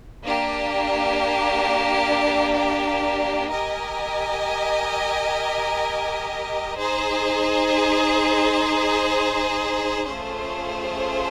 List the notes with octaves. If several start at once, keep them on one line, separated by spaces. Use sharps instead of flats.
A#3 D4 G4
G4 A#4 D#5 G#5
D#4 G#4 C5
A3 C#4 F4 G#4 C5